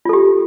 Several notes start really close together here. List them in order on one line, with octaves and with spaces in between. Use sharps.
F4 A4 G4